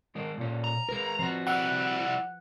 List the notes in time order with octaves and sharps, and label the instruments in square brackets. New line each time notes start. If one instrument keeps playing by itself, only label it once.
[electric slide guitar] D#3 G#3 A#4
A#2 C#4
[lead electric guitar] A#5
[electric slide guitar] G#3 A#4 [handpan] B4
[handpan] F3 [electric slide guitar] C4 F#4
[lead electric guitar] G3 E4 [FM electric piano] F#5